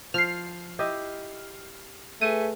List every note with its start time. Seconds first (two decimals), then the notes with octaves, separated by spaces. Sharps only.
0.14 F3 F6 C7
0.79 E4 G4 D#5
2.21 A3 G#4 B4 G#5 D#7